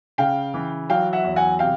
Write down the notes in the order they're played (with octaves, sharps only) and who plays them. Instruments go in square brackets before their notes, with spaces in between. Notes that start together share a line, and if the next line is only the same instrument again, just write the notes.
[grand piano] C#3 [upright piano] F5 G5
[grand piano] E3
[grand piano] F#3 [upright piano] F5 G5
[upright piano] E5 F#5
[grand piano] E2
[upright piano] F#5 G#5
[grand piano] C3 [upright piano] F5 G5